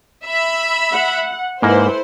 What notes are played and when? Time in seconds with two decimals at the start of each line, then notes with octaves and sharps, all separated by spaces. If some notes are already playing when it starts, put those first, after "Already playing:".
0.25 E5 B5
0.92 F#5
1.62 G#2 A#3 E4 A4 B4 C5